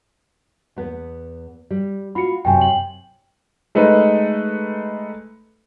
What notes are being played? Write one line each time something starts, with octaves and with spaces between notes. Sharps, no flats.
E2 B3
G3
F4 F#4 B5 C#7
F#2 C3 G5 G#5
G5 F#7
G#3 A3 D#4 B4